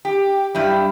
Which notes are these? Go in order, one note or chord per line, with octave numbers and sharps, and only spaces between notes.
G4
G2 G3 E4